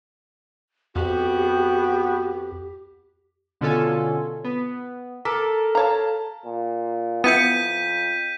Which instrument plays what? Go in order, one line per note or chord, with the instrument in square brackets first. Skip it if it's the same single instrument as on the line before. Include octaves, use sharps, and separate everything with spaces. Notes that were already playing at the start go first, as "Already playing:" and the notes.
[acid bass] F2 [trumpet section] B3 G5 [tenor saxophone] F#4 [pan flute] G4
[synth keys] B2 D3 C#4 F4 A4 G#5
B3
[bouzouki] A4 [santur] A#4 [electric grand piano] D6 B6
[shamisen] C#5 A#5 [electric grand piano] F5 A5
[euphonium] A#2
[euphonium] F2 [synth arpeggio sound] B3 E4 C#7 [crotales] G6 B6 D#7